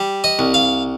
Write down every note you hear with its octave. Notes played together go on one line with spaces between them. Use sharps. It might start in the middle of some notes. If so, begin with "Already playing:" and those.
Already playing: G3
D#5
C2
F5